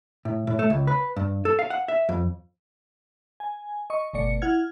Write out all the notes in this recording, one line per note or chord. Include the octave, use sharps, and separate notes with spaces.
A2
A2
A3
C#2
B4
G2
A4
F5
F#5
E5
F2
G#5
D#5 C#6
G1 B2 A3 D5 C#7
E4 F#5 F6 G#6